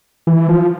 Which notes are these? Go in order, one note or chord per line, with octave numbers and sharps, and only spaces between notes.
E3
F3